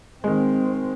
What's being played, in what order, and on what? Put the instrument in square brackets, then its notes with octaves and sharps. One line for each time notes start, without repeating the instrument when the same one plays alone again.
[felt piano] D#3 G#3 [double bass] C4